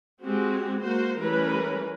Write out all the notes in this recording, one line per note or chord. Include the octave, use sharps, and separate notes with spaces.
G#3 C4 F#4 G4
A#3 F#4 C5
E3 G3 A3 C#4 A#4 B4